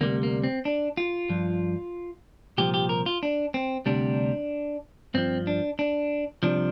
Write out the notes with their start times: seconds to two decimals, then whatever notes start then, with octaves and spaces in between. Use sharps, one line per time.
0.01 D2 C3 G3 A#3
0.23 A#3
0.44 C4
0.65 D4
0.97 F4
1.29 G2 F3
2.58 C2 A#2 F3 G4
2.74 G4
2.89 A#4
3.06 F4
3.23 D4
3.54 C4
3.86 D2 C3 G3 D4
5.14 G2 F3 C4
5.47 D4
5.79 D4
6.43 C2 C3 F3 D4